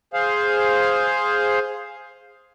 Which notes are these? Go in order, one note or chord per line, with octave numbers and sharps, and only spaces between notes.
G#4 C5 F5